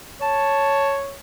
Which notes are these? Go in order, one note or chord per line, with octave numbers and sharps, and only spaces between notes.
C#5 A5